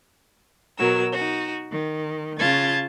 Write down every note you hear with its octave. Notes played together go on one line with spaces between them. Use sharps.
B2 F#3 A#4 E6
D#4 F#4
D#3
C#3 F4 A5 G#6 A6